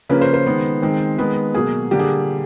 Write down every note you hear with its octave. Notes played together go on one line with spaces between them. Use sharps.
C#3 F3 A#3 C#4 B4
C5
C5
D#3 G#3 B3
D#3 G#3 C4
D#3 G#3 B3 B4
B2 F#3 A#3 G#4
D3 G3 A#3 G4
G#4